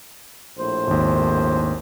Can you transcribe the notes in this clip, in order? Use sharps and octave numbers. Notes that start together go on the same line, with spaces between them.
A#1 A2 C5
G#1 D#2